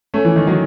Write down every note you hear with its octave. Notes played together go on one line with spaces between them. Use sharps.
A3 C#4
E3
D#3
D#3 F#3